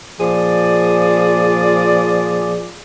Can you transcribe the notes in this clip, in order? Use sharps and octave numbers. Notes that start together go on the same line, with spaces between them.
A#2 F3 G#4 D5